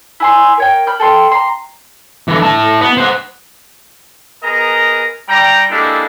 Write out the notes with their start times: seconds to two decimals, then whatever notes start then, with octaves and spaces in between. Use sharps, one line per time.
0.20 E4 G#5 C6
0.58 A#4 C#5 G5
0.87 B5 F6 G6
1.00 A4 G5 C6
1.31 A#5 C6
2.28 D3 E3
2.43 E4 A5
2.81 B3
2.97 C5 F#5
4.43 B3 G#4 A#4 D#5 A#5
5.29 G3 G5 A#5
5.70 G#3 A#3 D4 E4 G4 A4